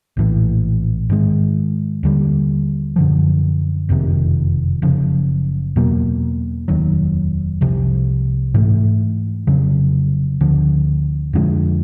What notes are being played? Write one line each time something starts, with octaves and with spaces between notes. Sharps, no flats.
A#1 A2 E3
G#2 D#3 G#3
D#2 D3 G3
F#2 D3 F3
F#1 F2 C3 D#3
F#1 F#2 C#3 F3
E2 B2 F#3 A#3
F1 D#2 D#3 F#3
C2 C3 F3
G#2 E3 A3
F1 F2 C#3 F#3
D2 D3 F3
F2 D3 F3 G#3